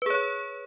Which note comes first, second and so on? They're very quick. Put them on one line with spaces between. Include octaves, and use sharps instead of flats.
B4 G#4 C#5